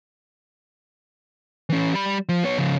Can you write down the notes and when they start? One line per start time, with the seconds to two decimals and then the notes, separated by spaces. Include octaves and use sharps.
1.70 E3 C#4
1.93 G3 B5
2.29 F3
2.44 B3 C#5
2.58 C#3 F3